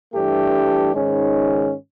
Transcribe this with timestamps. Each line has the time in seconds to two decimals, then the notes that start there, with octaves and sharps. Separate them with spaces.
0.14 G2 E3 A3 D4 G4
0.94 G#2 D#3 G#3 C#4